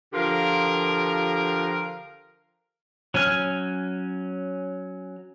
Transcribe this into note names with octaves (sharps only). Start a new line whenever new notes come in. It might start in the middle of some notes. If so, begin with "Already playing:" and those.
D3 F3 F4 G4 A#4
F#3 C#4 G#5 F6